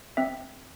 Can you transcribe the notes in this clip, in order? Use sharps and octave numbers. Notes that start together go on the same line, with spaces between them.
C4 E5